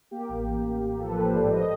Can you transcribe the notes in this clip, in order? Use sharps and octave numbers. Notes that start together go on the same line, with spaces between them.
A#3 G4
A1
A#3
A1
A#3
F3 A4
B4
A1 C5
G#2 D5
D#5